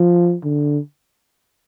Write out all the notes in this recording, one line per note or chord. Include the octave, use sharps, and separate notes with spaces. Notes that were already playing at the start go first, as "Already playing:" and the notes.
Already playing: F3
D3